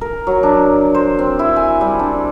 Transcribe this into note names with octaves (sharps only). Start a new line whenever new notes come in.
A#4
F#3
D4
C5
C4
E4
G#5
G3
D4